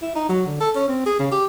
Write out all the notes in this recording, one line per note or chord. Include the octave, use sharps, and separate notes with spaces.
E4
D#4
F#3
D3
A4
C#4
C4
G#4
C#3
G4